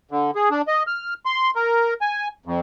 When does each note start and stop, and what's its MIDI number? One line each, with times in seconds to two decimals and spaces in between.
0.11 0.31 50
0.35 0.49 68
0.51 0.62 62
0.68 0.83 75
0.87 1.14 89
1.26 1.51 84
1.55 1.94 70
2.01 2.28 80
2.46 2.60 41